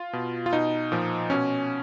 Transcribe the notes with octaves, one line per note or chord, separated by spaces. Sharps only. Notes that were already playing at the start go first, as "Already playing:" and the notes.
Already playing: F4
B2
F4
B2 D#4
A#2 F3
B2 C#4